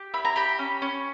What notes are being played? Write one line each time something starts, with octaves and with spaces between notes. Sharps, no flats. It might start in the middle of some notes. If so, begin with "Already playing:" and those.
Already playing: G4
E4 B5
A#5
G4 B5
C#4
C#4